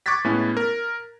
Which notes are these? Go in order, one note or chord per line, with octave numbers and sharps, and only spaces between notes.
C#6 D6 F#6 G#6 A6 B6
A2 G#3 B3 C#4 E4
A#4